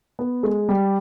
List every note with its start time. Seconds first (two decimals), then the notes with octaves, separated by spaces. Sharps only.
0.19 B3
0.43 G#3
0.69 G3